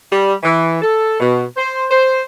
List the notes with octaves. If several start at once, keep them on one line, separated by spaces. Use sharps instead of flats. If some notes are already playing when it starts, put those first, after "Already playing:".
G3
E3
A4
B2
C5
C5